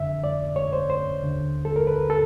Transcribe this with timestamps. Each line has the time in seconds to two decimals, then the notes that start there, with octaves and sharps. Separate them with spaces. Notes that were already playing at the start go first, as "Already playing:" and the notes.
Already playing: F2 D3 E5
0.24 D5
0.56 C#5
0.73 C5
0.90 C5
1.22 D#2 D3
1.65 A4
1.76 A#4
1.87 B4
2.10 A4